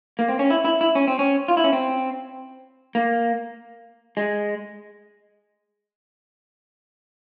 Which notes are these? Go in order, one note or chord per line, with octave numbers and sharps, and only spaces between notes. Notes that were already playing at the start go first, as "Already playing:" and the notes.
A#3
C4
C#4
E4
E4
E4
C#4
C4
C#4
F4
E4
C#4
C4
A#3
G#3